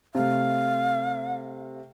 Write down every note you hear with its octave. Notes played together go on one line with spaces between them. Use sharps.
C3 A3 F5